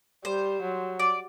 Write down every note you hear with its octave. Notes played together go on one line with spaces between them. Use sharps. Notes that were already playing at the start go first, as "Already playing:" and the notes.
G3 C5
F#3
D5